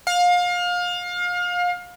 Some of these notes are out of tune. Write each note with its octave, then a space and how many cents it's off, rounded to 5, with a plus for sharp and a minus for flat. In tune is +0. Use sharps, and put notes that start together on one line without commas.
F5 +30